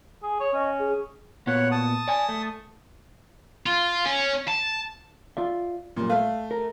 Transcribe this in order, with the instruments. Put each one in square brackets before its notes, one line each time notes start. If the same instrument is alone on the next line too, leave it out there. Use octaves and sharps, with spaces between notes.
[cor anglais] G#4
C#5
[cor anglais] C#4 [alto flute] D#5
[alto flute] G#4
[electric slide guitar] A#2 B3 [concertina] C#5 F#5
[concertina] A5 D#6
[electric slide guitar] D5 G#5
A3
[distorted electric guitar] F4
C#4
A5
[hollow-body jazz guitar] F4 D5 E5
[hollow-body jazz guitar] F#2 G3 [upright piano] A#2
[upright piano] A3 [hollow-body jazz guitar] F5
[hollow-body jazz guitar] A#4